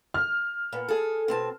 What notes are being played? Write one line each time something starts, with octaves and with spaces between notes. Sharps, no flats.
F6
A#2 B3
G#4 A4
B2 C4 A5